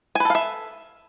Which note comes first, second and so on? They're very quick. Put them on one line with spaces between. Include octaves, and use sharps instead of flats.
G#5 B4 A4 F5 E5